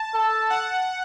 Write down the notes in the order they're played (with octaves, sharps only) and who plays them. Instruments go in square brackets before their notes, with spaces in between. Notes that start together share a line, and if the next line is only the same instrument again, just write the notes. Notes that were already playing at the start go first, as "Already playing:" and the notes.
Already playing: [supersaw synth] A5
[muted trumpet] A4
[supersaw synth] F#5